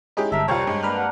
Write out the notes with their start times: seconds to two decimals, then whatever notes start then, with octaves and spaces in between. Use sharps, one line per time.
0.17 G#3 C#4 D#4 E4 G4 G#4
0.32 G1 A4 A#4 E5
0.48 C2 F2 G3 C4 F4 A#4 C#5
0.67 G2 G#3
0.83 A#3 D4 A#4 B4 F6 F#6
0.98 F#5